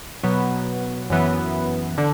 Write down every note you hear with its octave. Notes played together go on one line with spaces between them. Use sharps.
B2 F#3 B3
F#2 E3 B3
D3